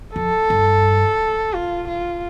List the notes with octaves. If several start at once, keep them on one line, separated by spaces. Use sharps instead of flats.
F2 A4
G2
F4
F4